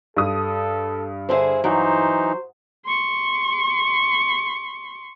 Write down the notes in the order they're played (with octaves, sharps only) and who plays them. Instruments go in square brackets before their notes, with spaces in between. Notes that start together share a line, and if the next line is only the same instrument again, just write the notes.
[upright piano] G2 D#6 [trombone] A4
[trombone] D3 [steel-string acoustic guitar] E4 G#4 C5
[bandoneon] E3 D#4 [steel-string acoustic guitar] F#3 [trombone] C5
[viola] C6 C#6